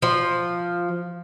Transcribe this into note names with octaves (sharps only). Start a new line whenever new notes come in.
F3